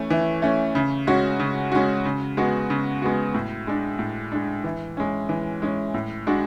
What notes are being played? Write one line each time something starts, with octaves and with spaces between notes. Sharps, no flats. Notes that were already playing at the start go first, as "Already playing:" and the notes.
Already playing: E3 A3 C#4
E3
A3 C#4
C#3
G#3 C#4 F#4
C#3
G#3 C#4 F#4
C#3
G#3 B3 F#4
C#3
G#3 B3 F#4
A2
G#3 D4
A2
G#3 D4
E3
G#3 C#4
E3
G#3 C#4
A2
G#3 D4 F#4